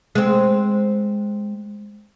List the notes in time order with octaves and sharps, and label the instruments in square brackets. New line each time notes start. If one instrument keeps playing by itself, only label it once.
[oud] G#3 C4